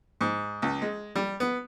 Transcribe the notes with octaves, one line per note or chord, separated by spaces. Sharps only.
G#2
C#2
G#3
G3
B3